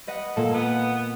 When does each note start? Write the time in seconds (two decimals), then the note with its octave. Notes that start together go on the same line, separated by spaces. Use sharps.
0.07 B4 D#5 F#5
0.37 A#2 A#3 A4
0.54 B3